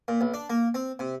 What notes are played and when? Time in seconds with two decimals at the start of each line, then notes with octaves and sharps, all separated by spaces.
0.08 A#2
0.21 B1
0.34 D4
0.50 A#3
0.74 C4
0.99 C3